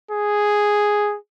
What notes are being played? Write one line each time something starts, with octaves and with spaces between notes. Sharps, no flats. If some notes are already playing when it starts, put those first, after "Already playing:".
G#4